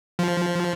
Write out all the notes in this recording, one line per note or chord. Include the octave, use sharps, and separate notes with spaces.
F3